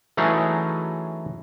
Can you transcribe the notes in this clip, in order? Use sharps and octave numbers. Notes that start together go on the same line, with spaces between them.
E3 F#3 A3 C#4 D#4 G#4